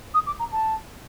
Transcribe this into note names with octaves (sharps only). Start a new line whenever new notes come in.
D#6
D6
A#5
A5